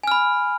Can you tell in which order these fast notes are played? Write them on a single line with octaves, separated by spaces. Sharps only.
G#5 F6 B5